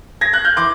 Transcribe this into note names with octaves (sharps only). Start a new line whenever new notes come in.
G#6 A#6
F#6 G#6
F6 G6
E3 C6 D6